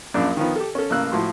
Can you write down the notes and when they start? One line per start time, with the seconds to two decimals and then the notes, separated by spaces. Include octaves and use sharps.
0.14 A#1 F#2 A#2 D4 D5
0.37 D#3 F3 B3
0.56 G4 A4
0.75 C#4 A4
0.90 A1 C#3 A#3 E6 F#6
1.12 A2 F3 F#4 C6